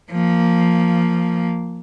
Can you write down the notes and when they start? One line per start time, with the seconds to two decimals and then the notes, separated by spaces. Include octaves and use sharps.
0.11 F3 A#3